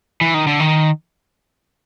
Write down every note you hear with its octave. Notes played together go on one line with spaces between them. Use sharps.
E3
D#3
D3
D#3